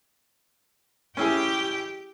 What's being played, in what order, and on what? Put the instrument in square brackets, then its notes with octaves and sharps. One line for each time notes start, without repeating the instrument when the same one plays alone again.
[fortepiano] C#4 E4 G#4 [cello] G4 G5